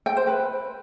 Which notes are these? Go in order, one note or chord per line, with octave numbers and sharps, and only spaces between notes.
G5
C5
B4